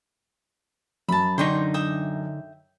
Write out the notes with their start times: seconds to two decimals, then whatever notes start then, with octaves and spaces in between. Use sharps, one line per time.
1.09 F#2 A5 B5
1.38 D3 D4 D#4 C5 G5 C#6
1.74 E5 G5 D#6